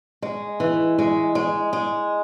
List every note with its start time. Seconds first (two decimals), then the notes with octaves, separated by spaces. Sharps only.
0.22 G#3
0.60 E3
0.99 G#3
1.35 G#3
1.73 G#3